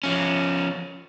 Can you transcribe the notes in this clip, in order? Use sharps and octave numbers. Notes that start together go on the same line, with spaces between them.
F3 C#4